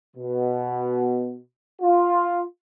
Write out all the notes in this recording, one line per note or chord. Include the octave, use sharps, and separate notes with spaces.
B2
F4